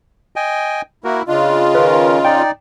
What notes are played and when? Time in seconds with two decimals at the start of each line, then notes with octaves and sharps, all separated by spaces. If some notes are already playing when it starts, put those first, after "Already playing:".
0.36 D#5 G5 G#5
1.04 A#3 E4 F#4 A#4
1.28 C#3 D4 F4 D#5
1.75 D#3 C#4 A#4 B4
2.25 D#4 D5 G5